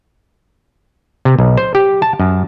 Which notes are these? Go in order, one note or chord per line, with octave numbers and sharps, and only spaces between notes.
C3
B1
C5
G4
A5
F#2